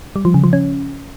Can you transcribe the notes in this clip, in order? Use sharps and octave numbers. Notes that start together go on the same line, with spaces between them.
G3
F3
C#3
F3
C#4